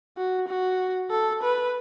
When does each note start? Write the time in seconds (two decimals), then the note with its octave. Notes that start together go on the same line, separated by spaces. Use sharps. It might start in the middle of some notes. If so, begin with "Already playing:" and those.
0.17 F#4
0.48 F#4
1.11 A4
1.43 B4